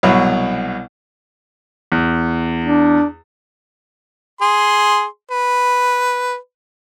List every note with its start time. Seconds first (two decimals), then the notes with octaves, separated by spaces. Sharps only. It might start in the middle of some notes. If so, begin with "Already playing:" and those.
0.03 C2 B2 F#3
1.92 E2
2.64 D4
4.41 G#4 C6
5.31 B4